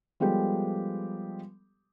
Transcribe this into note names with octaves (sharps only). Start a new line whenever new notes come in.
F3 G3 G#3 B3 G4 A4